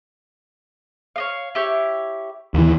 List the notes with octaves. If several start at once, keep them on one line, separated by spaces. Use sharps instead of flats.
C#5 D#5 F5
E4 G4 C#5
D#2 E3